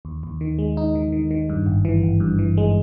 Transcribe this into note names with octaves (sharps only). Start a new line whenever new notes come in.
D#2
D#2
D#3
G#3
D#4
D#3
D#3
D#3
G2
G#1
E3
G#1
G2
E3
G#3